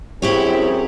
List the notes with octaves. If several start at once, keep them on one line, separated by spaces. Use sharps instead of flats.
F#2 C4 E4 G4 G#4 C#5